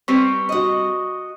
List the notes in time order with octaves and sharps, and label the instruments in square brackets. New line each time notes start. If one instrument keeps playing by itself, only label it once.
[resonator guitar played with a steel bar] G3 C4 B4 [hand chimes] C#6
[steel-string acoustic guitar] F#4 D#5